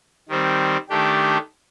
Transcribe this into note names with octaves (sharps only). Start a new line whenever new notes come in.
D#3 G3 C4
D#3 A3 D4 G4